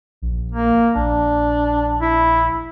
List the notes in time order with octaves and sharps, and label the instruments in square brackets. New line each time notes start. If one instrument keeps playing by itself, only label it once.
[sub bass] A#1
[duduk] A#3
[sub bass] A#1 [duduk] D4
[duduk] E4